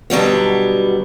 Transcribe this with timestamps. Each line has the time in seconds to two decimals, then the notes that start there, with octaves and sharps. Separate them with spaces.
0.10 B2 D3 F#3 G3 B3